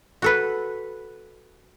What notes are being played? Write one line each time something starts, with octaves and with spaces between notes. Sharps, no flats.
F#4 A4 B4